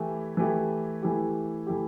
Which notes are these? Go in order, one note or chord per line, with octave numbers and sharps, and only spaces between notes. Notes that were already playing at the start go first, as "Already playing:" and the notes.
Already playing: E3 A3 E4 G4
E3 A3 E4 G4
E3 A3 E4 G4
E3 A3 E4 G4